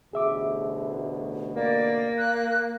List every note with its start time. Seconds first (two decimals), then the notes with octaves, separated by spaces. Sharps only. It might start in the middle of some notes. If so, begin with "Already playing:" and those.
0.13 A1 D2 B2 G#4 E5 D6
1.56 A#3 D5
2.18 F#6